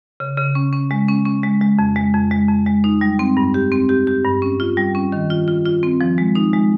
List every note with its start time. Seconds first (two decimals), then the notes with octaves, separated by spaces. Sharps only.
0.20 C#3
0.37 C#3
0.55 C#4
0.73 C#4
0.91 G#3
1.08 C#4
1.25 C#4
1.43 G#3
1.61 G#3
1.79 F2
1.96 G#3
2.14 F2
2.31 G#3
2.49 F2
2.66 G#3
2.84 D#4
3.01 G3
3.19 C4
3.37 G2
3.54 G4
3.72 C4
3.89 G4
4.07 G4
4.25 G2
4.42 C#4
4.60 F4
4.77 G3
4.95 C#4
5.12 D#3
5.30 F4
5.48 F4
5.66 F4
5.83 C4
6.01 F3
6.18 G#3
6.35 D#4
6.53 G#3